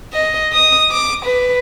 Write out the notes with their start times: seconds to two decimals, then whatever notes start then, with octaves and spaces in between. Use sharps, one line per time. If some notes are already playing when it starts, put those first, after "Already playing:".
0.13 D#5
0.53 D#6
0.91 D6
1.25 B4